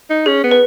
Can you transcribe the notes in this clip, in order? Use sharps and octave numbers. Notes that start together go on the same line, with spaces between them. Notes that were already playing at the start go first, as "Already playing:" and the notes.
D#4
C#4 G#4
B3
B4